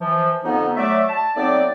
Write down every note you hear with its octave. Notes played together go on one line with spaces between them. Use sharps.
E3 F3
F2 D3 B3 D#4
F#3 A3 D5 E5
A5
F#3 A3 B3 C4 D#4 D5